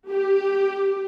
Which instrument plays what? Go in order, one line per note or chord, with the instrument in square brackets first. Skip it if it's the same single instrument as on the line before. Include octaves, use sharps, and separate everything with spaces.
[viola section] G4